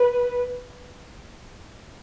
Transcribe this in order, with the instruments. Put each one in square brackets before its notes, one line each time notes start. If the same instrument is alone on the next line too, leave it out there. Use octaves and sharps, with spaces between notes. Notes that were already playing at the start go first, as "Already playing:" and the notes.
Already playing: [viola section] B4